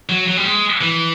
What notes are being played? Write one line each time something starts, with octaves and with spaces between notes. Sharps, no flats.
F#3
F#3
G3
G#3
E3